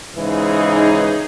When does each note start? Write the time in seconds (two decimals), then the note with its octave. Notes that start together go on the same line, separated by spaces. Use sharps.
0.15 G#2 C#3 E3 D#4 G#4